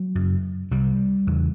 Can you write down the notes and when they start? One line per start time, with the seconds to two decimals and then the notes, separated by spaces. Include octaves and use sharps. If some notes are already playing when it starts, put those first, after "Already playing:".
Already playing: F#3
0.15 F#2 C#3
0.71 C2 C3 G3
1.27 E2 C#3